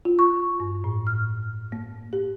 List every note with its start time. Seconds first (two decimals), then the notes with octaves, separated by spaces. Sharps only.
0.05 F4
0.19 C#6
0.60 G2
0.84 A2
1.07 F6
1.72 A#3
2.13 G4